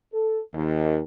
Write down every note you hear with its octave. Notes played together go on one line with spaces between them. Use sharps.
A4
D#2